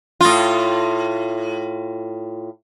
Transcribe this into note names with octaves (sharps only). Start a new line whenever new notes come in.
A2 F4